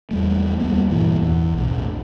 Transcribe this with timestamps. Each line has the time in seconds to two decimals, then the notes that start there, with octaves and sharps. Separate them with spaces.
0.11 E2 G3 A3
0.60 D2 G3 A#3 B3
0.90 G2 A#2 E3
1.22 E2
1.54 B1 A2